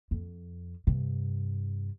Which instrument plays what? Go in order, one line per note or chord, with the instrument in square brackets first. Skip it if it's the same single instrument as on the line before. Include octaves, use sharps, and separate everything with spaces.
[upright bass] F2
G2 C3